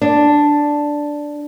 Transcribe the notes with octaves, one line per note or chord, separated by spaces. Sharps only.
D4